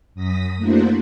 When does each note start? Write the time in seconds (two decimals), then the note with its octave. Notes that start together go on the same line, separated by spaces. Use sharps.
0.14 F#2 D#6 A#6 B6
0.57 A3 A#3 D4 E4 F#4 C5